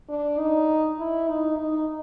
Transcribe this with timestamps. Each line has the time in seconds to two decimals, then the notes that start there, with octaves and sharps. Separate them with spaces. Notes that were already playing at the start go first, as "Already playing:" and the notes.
0.09 D4
0.39 D#4
0.99 E4
1.28 D#4
1.58 D#4